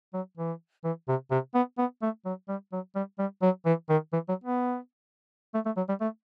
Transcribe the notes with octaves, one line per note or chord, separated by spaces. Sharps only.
F#3
E3
E3
C3
C3
B3
B3
A3
F#3
G3
F#3
G3
G3
F#3
E3
D#3
E3
F#3
B3
A3
A3
F#3
G3
A3